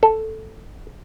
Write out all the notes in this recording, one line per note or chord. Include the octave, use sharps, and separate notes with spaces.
A4